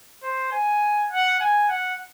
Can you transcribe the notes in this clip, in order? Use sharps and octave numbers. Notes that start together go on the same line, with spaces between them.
C5
G#5
F#5
G#5
F#5